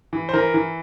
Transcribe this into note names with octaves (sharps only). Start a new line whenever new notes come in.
E3
C5
E3 A#4
E3